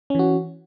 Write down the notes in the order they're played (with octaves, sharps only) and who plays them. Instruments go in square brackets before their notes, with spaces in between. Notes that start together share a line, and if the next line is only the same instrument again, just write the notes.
[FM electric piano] C#4
E3
F#4